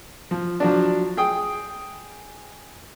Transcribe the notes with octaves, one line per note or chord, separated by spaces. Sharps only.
F3
F3 F#3 D4
G#4 G5 D#6